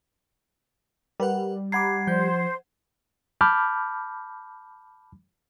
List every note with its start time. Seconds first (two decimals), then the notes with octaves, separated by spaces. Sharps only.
1.20 G3 A#4 B4 F#5
1.72 F#5 A#5 B5 D6 G#6 C7
2.07 F3 C5 G6
3.41 A5 B5 D6 F6 G6